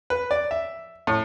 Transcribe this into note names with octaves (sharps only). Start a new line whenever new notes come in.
B4
D5
E5
A2